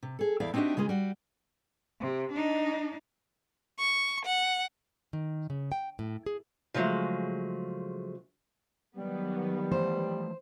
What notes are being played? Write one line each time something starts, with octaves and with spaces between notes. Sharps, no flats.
C3
G#4 A4
E2 E4 D5 E5 F5
C4 D4 D#4 F#4 G4 E5
C#3 G#3 F4 G#4
G3 F#4
C3
D4 D#4
C#6
F#5
D#3
C#3
G5
A2
G#4
C#3 F3 F#3 G#3 A3
D#3 F#3 G3 B3
E3 F3 A3 C5